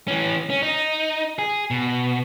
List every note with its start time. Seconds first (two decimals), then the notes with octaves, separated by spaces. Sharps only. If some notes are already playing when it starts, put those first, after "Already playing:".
0.08 E3 C#4
0.50 C#4
0.63 D#4
1.39 G#4
1.71 B2